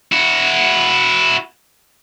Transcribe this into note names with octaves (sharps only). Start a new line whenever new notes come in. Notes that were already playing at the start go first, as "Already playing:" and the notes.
E4 F#4